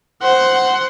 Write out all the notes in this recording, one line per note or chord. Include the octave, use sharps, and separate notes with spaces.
C5 F#5